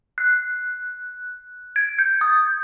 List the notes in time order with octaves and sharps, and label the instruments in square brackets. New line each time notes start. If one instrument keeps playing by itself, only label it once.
[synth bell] F#6
G#6
G6
D#6